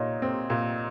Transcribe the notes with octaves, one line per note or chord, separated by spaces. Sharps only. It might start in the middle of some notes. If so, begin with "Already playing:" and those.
Already playing: A#2 D#4 C#5 D#5
C4
A#2